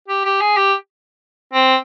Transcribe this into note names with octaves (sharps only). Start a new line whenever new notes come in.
G4
G4
G#4
G4
C4